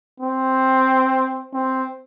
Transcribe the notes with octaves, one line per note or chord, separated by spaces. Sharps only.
C4
C4